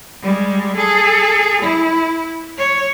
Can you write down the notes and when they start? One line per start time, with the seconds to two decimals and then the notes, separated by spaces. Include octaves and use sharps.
0.22 G3 G#3
0.76 G#4 A4
1.61 E4
2.57 C#5